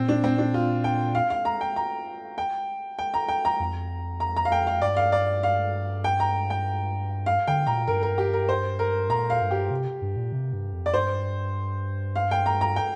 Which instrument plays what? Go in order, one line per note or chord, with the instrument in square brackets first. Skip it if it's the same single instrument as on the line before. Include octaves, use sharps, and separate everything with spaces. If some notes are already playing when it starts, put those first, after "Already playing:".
Already playing: [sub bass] A#2 [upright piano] C4
[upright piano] D4
C4
D4
F4
G5
F5
F5
A#5
G5
A#5
G5
G5
A#5
G5
A#5
[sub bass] F2
[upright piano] A#5
A#5
F5
G5
F5
[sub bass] G2 [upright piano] D5
[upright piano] F5
D5
F5
G5
A#5
G5
F5
[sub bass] D3 [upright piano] G5
[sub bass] A#2 [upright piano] A#5
[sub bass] G2 [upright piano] A#4
[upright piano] A#4
G4
A#4
C5
A#4
[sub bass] A#2 [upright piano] A#5
[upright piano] F5
[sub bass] G2
[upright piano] G4
[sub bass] C3
G2
A#2
C3
G2
F2
[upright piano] D5
[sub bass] G2 [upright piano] C5
[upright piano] F5
G5
A#5
A#5
G5